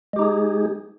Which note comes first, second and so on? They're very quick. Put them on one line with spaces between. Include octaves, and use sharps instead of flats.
G#3 G4 D#4 G#4